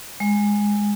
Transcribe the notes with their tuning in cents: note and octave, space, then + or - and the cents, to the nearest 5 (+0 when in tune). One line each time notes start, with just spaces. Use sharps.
G#3 -10